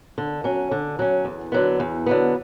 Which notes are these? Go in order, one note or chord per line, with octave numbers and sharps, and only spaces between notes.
D3
F#3 C#4
D3
F#3 C#4
E2
D3 F#3 B3
E2
D3 F#3 B3